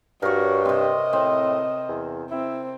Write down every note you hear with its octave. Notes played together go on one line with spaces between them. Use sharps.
G2 F#4 A#4 C#5
C3 C4 D#5
A2 C4
E2
C4 E4